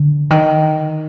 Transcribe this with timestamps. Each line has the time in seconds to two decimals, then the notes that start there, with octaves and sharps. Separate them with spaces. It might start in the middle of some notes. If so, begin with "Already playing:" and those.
Already playing: D3
0.30 D#3